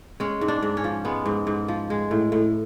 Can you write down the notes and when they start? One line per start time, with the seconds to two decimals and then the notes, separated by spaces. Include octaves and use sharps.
0.20 G#3 C#4
0.41 G#2
0.48 D4
0.62 G#2
0.77 C#4
0.84 F3
1.05 G#3 B3
1.26 G#2
1.47 G#2
1.68 F3
1.90 G#3
2.11 A2
2.32 A2